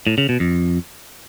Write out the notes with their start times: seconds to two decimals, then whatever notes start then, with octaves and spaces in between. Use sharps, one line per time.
0.07 A2
0.18 C#3
0.29 B2
0.40 F2